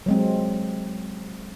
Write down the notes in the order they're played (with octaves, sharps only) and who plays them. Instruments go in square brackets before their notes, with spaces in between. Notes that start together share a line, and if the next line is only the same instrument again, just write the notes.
[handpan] F#3 G#3 C4